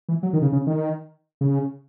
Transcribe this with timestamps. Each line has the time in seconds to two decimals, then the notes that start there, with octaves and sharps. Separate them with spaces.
0.09 E3
0.23 F#3
0.33 D#3
0.42 C#3
0.53 C#3
0.67 D#3
1.41 C#3